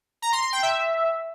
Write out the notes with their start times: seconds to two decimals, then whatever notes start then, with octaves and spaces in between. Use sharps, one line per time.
0.22 A#5
0.32 C6
0.42 C6
0.53 G5
0.63 E5